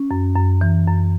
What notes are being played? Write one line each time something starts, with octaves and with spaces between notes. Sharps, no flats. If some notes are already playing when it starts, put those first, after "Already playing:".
Already playing: C#4
F#2
F#2
E3
F#2